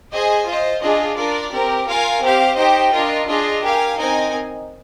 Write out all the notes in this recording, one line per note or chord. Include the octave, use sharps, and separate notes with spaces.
G#4 C5 D#5 G#5
F4 C5 D#5
D4 F4 G#4 D#5
D4 F4 A#4 D5
C4 G4 A#4
F4 A#4 F5 G#5
C4 G4 C5 F5
D#4 G4 C5 D#5 G5
D4 F4 A#4 D#5
D4 F4 G#4 D#5
G4 A#4 F5 G#5
C4 D#4 A#4 D#5 G#5